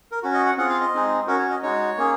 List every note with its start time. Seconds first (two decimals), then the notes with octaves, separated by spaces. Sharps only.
0.11 A#4
0.23 C#4 F#4
0.34 D#5
0.46 F#5
0.57 C4 F4 G#4 F#5
0.69 F5
0.81 D#5
0.93 G#3 C4 D#4 G#4
1.27 C#4 F#4 A#4
1.39 C#5
1.50 D#5
1.62 G#3 D#4 F#4 C#5
1.97 A#3 C#4 G#4